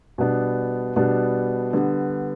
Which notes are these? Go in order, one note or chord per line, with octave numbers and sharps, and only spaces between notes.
B2 G3 B3 D4
B2 G3 B3 D4
D3 G3 B3